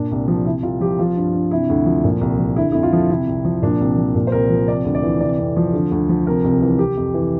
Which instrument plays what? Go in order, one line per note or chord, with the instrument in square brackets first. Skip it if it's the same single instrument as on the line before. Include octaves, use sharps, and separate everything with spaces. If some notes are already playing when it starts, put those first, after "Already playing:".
Already playing: [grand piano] A#2 D4
C2
F3
C3 E4
C2 F4
F3 G4
F3 F4
G2
G2
C3 E4
D2
F3
A#2
C2
F3
D3 E4
F2 E4
F4
F3
C3 E4
C2
F3
A#2 D4
C2
F3
A#2
C5
C2 A#4
F3
C3 D5
D2
D5
E3
C3 D5
F2
F3
D3
D2
F3
C3 A#4
C2
E3
C3 G4
F2
E3